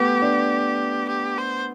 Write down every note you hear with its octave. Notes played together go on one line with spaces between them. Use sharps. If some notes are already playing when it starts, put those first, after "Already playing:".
Already playing: A3 B3 G4
D4
G4
C5